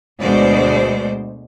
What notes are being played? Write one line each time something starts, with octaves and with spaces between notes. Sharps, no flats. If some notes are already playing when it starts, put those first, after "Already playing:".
D2 B2 G#3 C5 D5